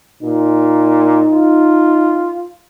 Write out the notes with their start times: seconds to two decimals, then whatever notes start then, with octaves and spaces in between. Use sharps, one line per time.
0.22 A#2 D#4
1.32 F4